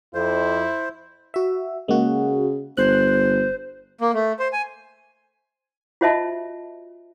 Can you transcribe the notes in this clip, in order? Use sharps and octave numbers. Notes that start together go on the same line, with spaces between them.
F2 E4 C5
F#4 E5
C#3 G#3 A#3 F#4
G1 C5 F#6
A#3
A3
C5
G#5
F4 F#4 C5 D#5 E5 A5